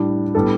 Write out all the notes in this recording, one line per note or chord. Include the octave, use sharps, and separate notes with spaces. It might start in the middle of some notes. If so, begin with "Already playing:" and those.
Already playing: A2 G3 D4
A2 G3 B3 D4 A4